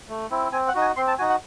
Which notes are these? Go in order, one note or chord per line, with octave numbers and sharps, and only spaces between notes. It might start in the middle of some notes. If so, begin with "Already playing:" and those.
A3
C4 E4
C4 G#5
F#5
D#4 F#4
G#5
C4 C6
A5
D#4 F#4 G#5
F#5